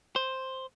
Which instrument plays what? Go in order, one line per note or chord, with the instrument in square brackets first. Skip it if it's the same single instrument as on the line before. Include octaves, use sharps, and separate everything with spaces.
[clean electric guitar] C5